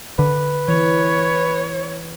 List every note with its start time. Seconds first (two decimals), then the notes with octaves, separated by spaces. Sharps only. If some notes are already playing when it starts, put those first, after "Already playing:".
0.19 D3 B4
0.68 E3 C#5